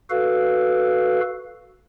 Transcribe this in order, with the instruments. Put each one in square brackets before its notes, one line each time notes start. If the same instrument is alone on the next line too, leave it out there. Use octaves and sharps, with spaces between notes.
[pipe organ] F#4 A4 B4 F5